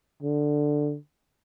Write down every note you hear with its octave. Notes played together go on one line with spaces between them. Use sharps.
D3